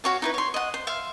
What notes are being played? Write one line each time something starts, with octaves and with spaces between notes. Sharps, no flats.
F#4 C#5 F5
D#4 E4 B4
C#5 C6
D#5 F#5
C5
E5 F5 C6